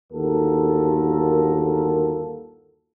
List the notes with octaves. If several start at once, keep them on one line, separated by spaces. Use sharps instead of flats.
G1 D#2 F4 F#4 A4 A#4